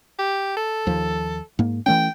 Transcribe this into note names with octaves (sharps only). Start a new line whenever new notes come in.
G4
A4
D#2 F3
G#2 A#3
E3 A3 C#4 G5